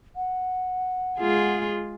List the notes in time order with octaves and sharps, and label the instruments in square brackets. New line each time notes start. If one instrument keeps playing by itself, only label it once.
[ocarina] F#5
[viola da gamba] G#3 F4 G#4